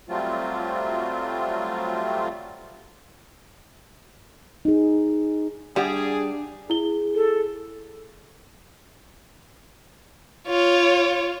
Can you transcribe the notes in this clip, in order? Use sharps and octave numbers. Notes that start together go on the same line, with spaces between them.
F#3 G3 A3 C4 F4
D#4 G#4
G3 D4 G4 G#4 E5 F#5
E4 G#4 G7
A4
F4 C#5